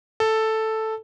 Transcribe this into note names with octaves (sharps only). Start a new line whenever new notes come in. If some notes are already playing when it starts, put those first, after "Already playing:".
A4